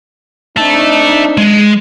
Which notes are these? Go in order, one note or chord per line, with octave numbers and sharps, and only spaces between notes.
C4 D4 D#4 E5 A5
G#3